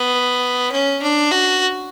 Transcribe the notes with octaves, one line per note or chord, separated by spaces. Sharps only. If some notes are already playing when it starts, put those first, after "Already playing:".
Already playing: B3
C#4
D4
F#4